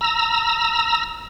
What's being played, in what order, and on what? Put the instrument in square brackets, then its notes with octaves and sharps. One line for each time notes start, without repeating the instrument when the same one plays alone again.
[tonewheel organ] A#5 E6